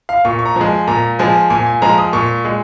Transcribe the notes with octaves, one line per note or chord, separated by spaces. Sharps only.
F5
A#2 C#6
C#6
A#5
F3 G#3
G#5
A#2 A#5
F3 G#3 G#5
A#2 G#5
G#5
F3 G#3 A#5
D#6
A#2 C#6
G#3